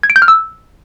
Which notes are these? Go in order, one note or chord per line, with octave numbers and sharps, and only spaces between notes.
G#6
D7
G6
F6
E6